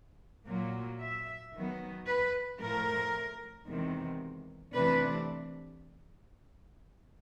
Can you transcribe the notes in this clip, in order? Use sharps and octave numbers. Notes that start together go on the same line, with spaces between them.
A#2 F#3 A#3
E5
D#3 F#3 B3
B4
A2 F3 A3 A#4
E2 C3 D#3 G#3
C3 E3 A3 D4 B4